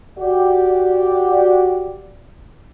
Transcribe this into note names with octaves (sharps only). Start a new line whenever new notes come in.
F#4 G4 D5